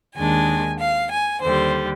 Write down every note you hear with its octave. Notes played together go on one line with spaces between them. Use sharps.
D#2 D#3 G#3 D4 G#5
F5
G#5
D#2 D3 G3 C5